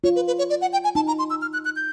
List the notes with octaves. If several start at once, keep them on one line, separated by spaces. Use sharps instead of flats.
F4 C#5
B4
B4
C#5
D5
F#5
G5
G#5
D#4 A5
A#5
C6
E6
F6
F#6
F#6
G6